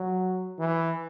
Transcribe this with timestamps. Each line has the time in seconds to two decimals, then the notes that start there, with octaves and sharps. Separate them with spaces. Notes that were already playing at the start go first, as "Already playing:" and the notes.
Already playing: F#3
0.59 E3